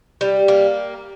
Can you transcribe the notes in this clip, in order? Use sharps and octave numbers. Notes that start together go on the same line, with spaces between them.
G3
A#3